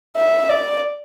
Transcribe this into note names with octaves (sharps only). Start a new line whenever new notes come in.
E5
D5